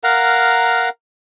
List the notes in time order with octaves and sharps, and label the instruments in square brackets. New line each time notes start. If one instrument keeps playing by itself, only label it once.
[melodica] A#4 F5 F#5 A#5